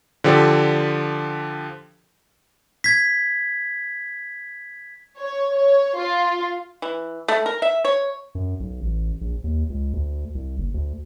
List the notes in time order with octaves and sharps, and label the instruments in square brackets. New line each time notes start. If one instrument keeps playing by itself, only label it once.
[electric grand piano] D3 F3 G4 A4
[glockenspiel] G#6 B6
[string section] C#5
C#5
F4
[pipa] E3
A3
A#4
E5
C#5
[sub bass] F#2
B1
A1
A#1
D#2
C#2
D2
C2
F#1
D2